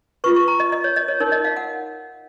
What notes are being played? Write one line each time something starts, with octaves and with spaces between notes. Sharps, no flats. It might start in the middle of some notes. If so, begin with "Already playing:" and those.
F4 B4 C#6
C#6
A#5
D#5
D#5
C#5
D#5
C#5
D#4 A#4 C#5
D#5
F5
F#5